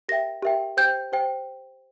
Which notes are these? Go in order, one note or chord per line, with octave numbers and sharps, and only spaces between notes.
G4 A#4 E5 G5 A#6
G4 A#4 E5 G5
G4 C5 G5 G6
G4 C5 G5